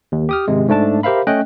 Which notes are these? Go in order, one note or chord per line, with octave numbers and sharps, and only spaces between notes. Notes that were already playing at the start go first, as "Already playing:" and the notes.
D#2
G4 D#6 F6
G#1 C3 G#3
G#2 A3 D4 A5
G4 A#4 C5 E5 F5 B5
A3 C#4 D#5 G5 F#6